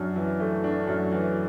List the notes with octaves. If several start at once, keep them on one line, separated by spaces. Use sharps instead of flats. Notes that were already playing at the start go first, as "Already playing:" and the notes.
Already playing: F#2 D4
E3
A3
D4
F#2
E3